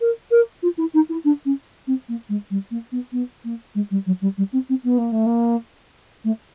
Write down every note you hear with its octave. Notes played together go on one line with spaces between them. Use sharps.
A#4
A#4
F4
E4
D#4
E4
D4
C#4
C4
A#3
G#3
G3
A#3
B3
B3
A#3
G#3
G3
F#3
G3
G3
C4
C4
B3
A#3
A3
A#3
A3